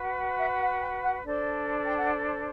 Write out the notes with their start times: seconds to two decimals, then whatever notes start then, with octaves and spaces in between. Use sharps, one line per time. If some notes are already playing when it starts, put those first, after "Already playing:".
Already playing: F#4 B4
0.39 E5
0.60 F#5
0.81 G5
1.03 F#5
1.24 D4 A4 C5 D5
1.85 G5
1.97 F#5